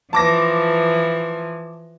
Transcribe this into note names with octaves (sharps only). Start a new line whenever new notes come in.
E3 F3 A5 D6 A#6